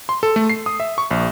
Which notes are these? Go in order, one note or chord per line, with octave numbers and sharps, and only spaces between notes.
C6
A4
A3
C7
D#6
E5
C#6
A#1